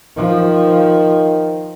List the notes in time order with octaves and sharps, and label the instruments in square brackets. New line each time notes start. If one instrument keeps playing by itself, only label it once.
[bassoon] D#3 [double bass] F3